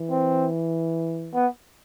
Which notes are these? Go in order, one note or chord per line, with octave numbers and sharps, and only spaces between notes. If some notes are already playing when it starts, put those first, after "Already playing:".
Already playing: E3
C4
B3